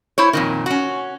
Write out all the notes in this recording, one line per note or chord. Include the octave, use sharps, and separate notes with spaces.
E4 C5 C#5
F2 A#2 D#3
C#4 F#4